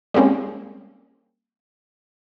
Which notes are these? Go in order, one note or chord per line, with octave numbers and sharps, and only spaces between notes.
G3 G#3 A#3 C4 C#4